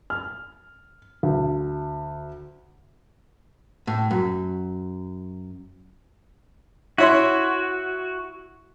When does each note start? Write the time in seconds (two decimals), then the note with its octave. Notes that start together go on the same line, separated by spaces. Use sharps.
0.10 F6
1.23 D2
3.87 A2
4.11 F#2
6.98 E4 F#4 C#5 C6